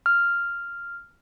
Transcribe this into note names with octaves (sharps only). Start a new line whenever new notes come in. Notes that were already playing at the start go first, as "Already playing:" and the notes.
F6